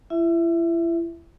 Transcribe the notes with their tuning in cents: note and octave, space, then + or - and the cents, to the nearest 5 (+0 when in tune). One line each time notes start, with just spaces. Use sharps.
E4 +35 E5 +0